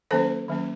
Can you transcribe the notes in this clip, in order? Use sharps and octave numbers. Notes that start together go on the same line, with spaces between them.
D#3 F#3 A#3 C#4 A4 C5
D#3 F#3 A#3 C#4